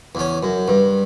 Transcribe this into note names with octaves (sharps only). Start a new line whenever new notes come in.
E2 C#4
F#2
G2